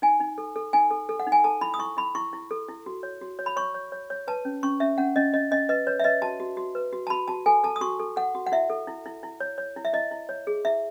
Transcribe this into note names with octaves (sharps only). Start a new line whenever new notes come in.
D#4 G#5
D#4
A4
A4
D#4 G#5
A4
A4
F#5
D#4
G#5
A4 A5
E4 B5
D#6
E4 C#6
E4 B5
E4 C#6
E4
A4
E4
F#4
C#5
F#4
C#5
B5
C#5 C#6
C#5
C#5
C#5
B4 A5
C#4
C#4 C#6
C#4 E5
C#4 F#5
C#4 D#5
C#4 D#5
C#4 D#5
B4 D#5
B4 C#5
E5
B4 D#5
F#4 A5
F#4
F#4
B4
F#4
A5
F#4 B5
F#4 A5
A4 G#5
A4 A5
D#6
F#4 C#6
A4
A4 F#5
F#4
F#5
E4 E5
A4
E4
E4
E4
C#5
C#5
E4
E5
E4 D#5
E4
C#5
G#4
E4 E5